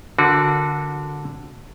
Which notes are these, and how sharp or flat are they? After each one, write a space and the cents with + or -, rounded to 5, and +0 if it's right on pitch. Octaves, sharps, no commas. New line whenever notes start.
D3 +0 F#4 -25 A#4 +0